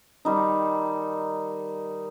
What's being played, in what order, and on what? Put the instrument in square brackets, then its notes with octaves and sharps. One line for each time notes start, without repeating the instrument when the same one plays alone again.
[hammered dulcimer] D#3 G3 D#4